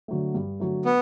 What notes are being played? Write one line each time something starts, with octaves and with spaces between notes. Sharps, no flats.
D3 F#3 A3
G2
D3 F#3 A3
B3